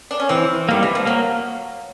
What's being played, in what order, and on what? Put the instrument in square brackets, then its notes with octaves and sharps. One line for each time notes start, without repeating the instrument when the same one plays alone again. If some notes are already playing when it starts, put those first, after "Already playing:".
[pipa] D4
C#4
[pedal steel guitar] E3 [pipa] C4
[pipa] D#3 [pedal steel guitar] G3 A#3
[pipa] E3
F3
[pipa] F#3 [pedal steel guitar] A#3